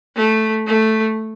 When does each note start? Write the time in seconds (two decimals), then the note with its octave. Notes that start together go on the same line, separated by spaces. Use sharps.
0.16 A3
0.67 A3